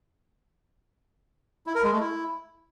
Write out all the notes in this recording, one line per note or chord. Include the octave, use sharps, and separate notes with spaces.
E4
A#4
G#3
A3
E4